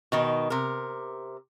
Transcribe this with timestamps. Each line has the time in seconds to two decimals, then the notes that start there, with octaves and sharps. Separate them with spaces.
0.12 B2 D#3 D#4
0.50 C3 A#4